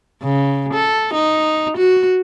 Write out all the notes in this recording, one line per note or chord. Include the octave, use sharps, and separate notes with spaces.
C#3
A4
D#4
F#4